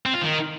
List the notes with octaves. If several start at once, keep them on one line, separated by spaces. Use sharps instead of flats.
C4
F4
D#3